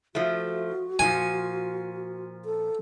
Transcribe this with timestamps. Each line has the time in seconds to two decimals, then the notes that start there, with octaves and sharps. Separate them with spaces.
0.15 F3 A3 F#4
0.99 A#2 D#3 F3 G#5
2.45 A4